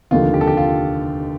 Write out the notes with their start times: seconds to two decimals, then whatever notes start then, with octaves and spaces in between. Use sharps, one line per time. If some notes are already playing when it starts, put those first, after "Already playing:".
0.11 F1 D#2 D3 F4
0.34 G4
0.41 A4
0.47 G4
0.57 F4